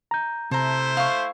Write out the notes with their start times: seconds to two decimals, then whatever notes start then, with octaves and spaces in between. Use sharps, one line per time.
0.11 A#5 G6
0.51 C3 A3 E4 C5 A5 A#5
0.97 F5 C#6